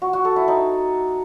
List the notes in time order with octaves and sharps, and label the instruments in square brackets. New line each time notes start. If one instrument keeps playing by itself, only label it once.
[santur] F#4
F#4
A4
E4
D#4